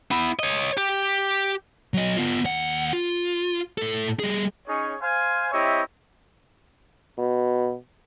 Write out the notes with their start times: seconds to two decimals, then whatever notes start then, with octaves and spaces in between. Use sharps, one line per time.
0.11 B3 E4
0.39 C#5 D#5
0.78 G4
1.94 F#3 D#5
2.17 B3 F4
2.45 D#2 F#5
2.93 F4
3.78 A2 A4
4.20 G3 G#4
4.67 C#4 D#4 G#4 C#5
5.01 C5 F5 G#5
5.52 C4 E4 G4 C#5 D#5 E5
7.19 B2